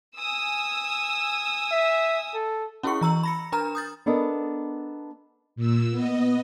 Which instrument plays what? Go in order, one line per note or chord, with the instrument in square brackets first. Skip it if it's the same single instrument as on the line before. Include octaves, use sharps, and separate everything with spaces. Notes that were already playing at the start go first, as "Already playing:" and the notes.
[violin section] G#5 D#6 E6
[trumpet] E5
A4
[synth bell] C#4 E4 F#4 G#4 C#6 C#7
E3 A#5 E6 F#7
B5 A#6 C#7
D4 A#4 A#5 F6 E7
D#6 G6 A6
[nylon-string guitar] B3 D4 A4 A#4 D#5
[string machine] A#2 E6
B3 D#5